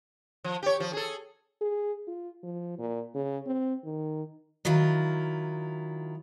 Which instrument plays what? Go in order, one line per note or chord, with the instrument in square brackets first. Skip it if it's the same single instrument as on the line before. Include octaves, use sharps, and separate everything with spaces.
[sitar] F3
G4 C#5
F3
G#4 A4
[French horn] G#4
F4
F3
A#2
C#3
C4
D#3
[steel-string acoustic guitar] D#3 F#3 E4 F4